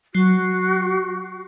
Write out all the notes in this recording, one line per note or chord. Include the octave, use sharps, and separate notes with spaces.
F#3 F#4 C7